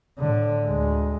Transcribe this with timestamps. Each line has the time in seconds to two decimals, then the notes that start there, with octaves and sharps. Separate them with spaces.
0.19 A2 D3
0.64 D2 G#3